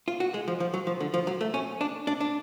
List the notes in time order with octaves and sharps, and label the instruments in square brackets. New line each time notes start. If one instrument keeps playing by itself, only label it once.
[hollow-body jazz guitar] F4
F#4
G#3
F3
F3
F#3
F3
D3
F3
F#3
A3
C#4
D4
D4
D4